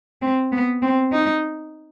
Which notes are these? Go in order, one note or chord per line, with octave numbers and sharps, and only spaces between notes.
C4
B3
C4
D#4